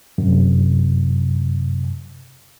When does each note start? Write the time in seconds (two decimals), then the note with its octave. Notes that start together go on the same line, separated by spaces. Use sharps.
0.18 F#2 C3